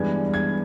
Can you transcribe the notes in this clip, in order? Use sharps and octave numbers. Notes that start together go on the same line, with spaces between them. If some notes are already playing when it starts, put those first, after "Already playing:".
Already playing: G2 E3 G#3 B3 D4 G#6
G#6